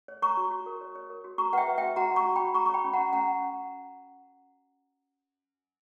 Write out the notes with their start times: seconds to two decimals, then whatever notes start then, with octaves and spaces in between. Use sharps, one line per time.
0.08 C#5
0.22 C#5 A#5 C#6
0.37 F#4
0.51 F#4
0.66 A#4
0.81 C#5
0.95 C#5
1.10 A#4
1.24 F#4
1.38 F#4 A#5 C#6
1.53 B4 E5 F#5 G5
1.68 B4
1.78 E5 G5
1.82 F#4
1.96 F#4 F#5 A#5
2.11 F#4
2.16 A#5 C#6
2.26 F#4
2.36 G5 B5
2.40 F#4
2.54 F#4 A#5 C#6
2.65 C#6
2.69 C#5 G5 B5
2.84 C#4
2.93 F#5 A#5
2.98 C#4
3.13 C#4 F#5 A#5